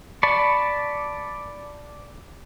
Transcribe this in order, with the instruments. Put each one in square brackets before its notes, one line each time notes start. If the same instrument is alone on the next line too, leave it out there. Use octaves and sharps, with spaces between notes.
[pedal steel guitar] D5 A5 B5 C#6